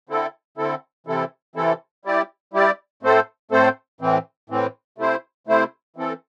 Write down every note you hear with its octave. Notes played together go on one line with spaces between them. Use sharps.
D3 C4 E4 A4
D3 C4 E4 A4
C3 E3 C4 E4 A4
C3 E3 C4 E4 A4
G3 E4 G4 D5
G3 E4 G4 D5
A2 A3 C4 A4 C5
A2 A3 C4 A4 C5
A2 E3 C4
A2 E3 C4
C3 A3 E4 C5
C3 A3 E4 C5
E3 C4 A4